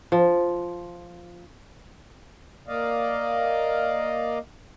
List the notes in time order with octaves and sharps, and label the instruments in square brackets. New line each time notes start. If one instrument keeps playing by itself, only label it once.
[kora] F3
[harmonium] A#3 D5 D#5 F5